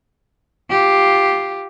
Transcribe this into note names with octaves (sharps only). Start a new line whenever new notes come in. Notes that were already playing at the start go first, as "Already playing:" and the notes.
F4 G4